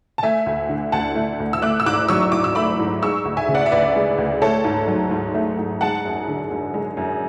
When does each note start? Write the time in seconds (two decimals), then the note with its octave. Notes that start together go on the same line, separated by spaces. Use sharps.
0.18 A5
0.23 A3 E5 G#5
0.46 D2
0.69 D3
0.92 D2 F#5 A5
1.15 A3
1.40 D2
1.53 E6
1.62 A3 D6 F#6
1.80 E6
1.86 G#2 D6 F#6
2.09 F#3 C#6 E6
2.32 G#2 D6
2.44 E6
2.55 A3 B5 D6
2.79 G#2
3.02 G#3 C#6 E6
3.25 D2
3.37 E5 G#5
3.48 C#3
3.55 D5 F#5
3.66 E5
3.72 D2 B4 D5
3.96 G#3
4.18 D2
4.42 A3 A4 C#5
4.64 G#2
4.88 F#3
5.11 G#2
5.34 A3
5.59 G#2
5.81 G#3 F#5 A5
6.05 F#2
6.28 D3
6.51 F#2
6.74 G#3
6.97 F#2